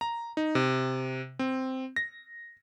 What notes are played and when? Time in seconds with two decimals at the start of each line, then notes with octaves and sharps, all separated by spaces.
0.01 A#5
0.37 D#4
0.55 C3
1.39 C4
1.96 A#6